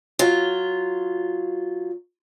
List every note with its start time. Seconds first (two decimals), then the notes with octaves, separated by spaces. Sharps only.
0.19 F#3 F4